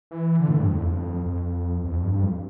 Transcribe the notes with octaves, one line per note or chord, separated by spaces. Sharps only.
E3
D3
A2
G2
F2
E2
F2
F2
E2
F2
G2
G2
F2